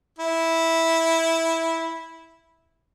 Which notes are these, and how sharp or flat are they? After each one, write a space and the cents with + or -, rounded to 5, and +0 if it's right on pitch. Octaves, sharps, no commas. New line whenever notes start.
E4 -10